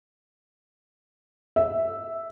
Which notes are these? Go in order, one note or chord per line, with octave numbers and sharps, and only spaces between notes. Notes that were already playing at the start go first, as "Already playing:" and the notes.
E5